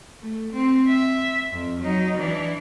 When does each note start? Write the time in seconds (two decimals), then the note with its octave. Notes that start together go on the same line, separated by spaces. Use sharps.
0.22 A3
0.53 C4
0.87 E5
1.52 F2
1.81 F#3 D#4
2.17 E3 D4